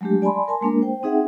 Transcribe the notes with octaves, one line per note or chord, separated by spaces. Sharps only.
F#3 G#3 A3 D4 G4
D5 G#5 A5 B5 C6
A#4 G#5 A5 C6
G#3 A#3 D4 A#4
C5 G5
C4 D#4 G#4 E5 F#5 G5